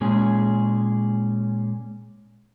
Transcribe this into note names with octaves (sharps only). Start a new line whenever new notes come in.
A#2 G#3 C#4 G#4